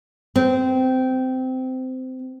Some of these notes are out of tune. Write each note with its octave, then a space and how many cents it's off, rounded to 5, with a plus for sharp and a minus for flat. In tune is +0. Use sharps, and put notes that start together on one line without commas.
C4 -20